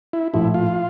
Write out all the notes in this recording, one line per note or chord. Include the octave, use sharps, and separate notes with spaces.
E4
A#1 A2 F3 E4
F4